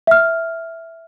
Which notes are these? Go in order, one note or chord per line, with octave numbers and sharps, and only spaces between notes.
E5 F6